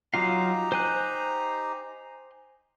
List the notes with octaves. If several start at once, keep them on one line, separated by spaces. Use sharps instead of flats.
F#3 D#4 F4 G4 F5 A#5
C5 G#5 F#6